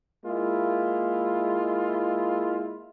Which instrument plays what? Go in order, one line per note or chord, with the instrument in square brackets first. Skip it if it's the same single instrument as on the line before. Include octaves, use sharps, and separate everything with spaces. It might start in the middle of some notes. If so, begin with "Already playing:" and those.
[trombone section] G#3 A#3 E4 F4